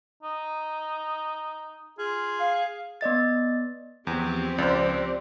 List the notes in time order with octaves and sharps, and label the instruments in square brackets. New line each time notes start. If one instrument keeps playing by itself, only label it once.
[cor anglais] D#4
[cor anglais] F4 [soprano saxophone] G#4
[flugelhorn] F5
[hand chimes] B3 D5 D#5 A6
[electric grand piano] E2 [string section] F3 C4 G4
[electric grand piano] C#2 [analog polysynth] C5 D5